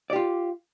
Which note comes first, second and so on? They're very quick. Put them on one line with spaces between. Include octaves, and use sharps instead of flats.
D5 G4 F4